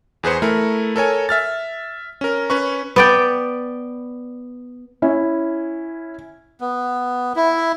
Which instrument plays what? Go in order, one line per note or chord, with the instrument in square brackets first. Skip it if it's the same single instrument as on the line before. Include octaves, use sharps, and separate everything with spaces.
[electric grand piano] E2 G#4 B4 C5 C#7
A3 E4 A#4
A4 A#4 C#5 G#5
E5 F6 A6
C#4 A#4
C#4 B4 C#6
[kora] B3 D5 G5
[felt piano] C#4 E4
[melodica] B3
E4